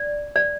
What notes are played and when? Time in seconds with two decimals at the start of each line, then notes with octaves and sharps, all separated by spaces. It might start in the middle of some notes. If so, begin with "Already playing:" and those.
Already playing: D5
0.36 D5